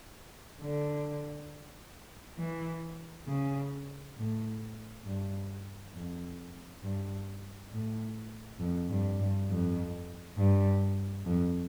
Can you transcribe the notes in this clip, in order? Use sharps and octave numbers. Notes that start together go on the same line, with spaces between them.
D3
E3
C#3
A2
G2
F2
G2
A2
F2
G2
G2
F2
G2
F2